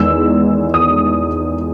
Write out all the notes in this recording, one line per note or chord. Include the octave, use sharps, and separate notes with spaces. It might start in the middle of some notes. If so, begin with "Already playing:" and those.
Already playing: E2 D#3 G#3 E6
D#6